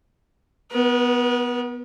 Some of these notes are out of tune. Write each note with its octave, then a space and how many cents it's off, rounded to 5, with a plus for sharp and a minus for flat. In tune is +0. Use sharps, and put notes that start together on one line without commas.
B3 +0 B4 -45